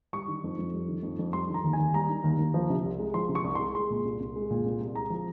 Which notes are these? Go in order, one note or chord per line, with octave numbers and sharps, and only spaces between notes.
G3 C#6
D#3
F2
F2
G3
D#3
F2
F2
G3 C6
D#3
A#5
D#2
G#5
D#2
G3 A#5
D#3
D#2
D#2
F3
C3
C2
G#3
F3 C6
C3
C#6
C2
G#3 C6
G#3 C6
A#2
C2
C2
G#3
A#2
C2
C2
G#3 A#5
F3